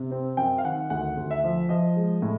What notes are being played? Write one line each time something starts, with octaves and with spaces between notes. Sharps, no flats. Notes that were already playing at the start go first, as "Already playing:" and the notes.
Already playing: C3
C4
F#2 G5
F5
D#3 F#5
D2 F#5
D2
E5
F3
F3 D#5
G#3
A2